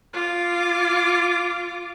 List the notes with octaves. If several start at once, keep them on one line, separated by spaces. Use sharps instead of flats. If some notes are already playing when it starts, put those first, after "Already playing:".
F4 D6